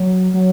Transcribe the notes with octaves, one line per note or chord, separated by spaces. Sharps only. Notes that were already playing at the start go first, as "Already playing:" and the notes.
Already playing: F#3
F#3